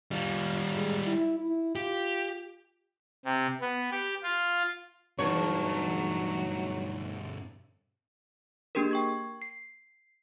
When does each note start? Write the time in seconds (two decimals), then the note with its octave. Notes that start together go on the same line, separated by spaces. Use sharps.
0.11 G3 F4
0.75 G#3
1.07 E4
1.39 E4
1.76 F4 G4
3.25 C3
3.61 B3
3.91 G4
4.23 F4
5.19 E2 G2 B2 F#3 D#4 B4 C#5 A5
8.75 A#3 D4 G4 G#4 A#4
8.91 G5 C#6 G#6
9.42 C7